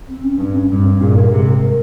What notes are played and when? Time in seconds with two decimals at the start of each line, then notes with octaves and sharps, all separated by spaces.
0.09 C4
0.24 C#4
0.39 G2 C4
0.54 C#4
0.70 G2 C4
0.85 C4
1.01 G2 A#2 G#4
1.17 A#4
1.31 G#2 C3 G#4
1.47 A#4
1.63 A#4